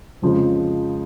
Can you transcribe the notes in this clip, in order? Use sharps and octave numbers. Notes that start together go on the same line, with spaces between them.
F2 C#3 F3 G#3